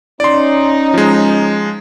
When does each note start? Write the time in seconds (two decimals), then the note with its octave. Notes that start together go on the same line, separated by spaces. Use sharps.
0.20 C#4 D#4 D5 C6
0.94 F3 G#3